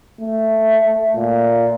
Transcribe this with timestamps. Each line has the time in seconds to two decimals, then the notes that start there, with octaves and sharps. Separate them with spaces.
0.21 A3
1.16 A#2